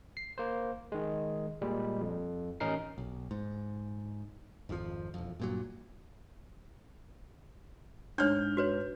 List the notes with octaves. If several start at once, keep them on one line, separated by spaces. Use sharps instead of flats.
C7
A#3 C5
D#3 G#3
A#2 G3 G#3
F2
A1 C#4 D#4 A#4 C7
B1
G#2
G#1 F2 C#3 F3
E1 F2
G2 A#2 F#3
G#2 D4 C#5 F6 G6
F#4 B4 C#5